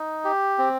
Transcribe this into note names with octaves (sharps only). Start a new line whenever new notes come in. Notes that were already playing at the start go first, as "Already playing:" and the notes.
Already playing: D#4
G4
C4